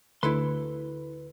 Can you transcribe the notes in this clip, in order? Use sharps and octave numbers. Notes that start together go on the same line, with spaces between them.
D2 E4 A4 B4 C6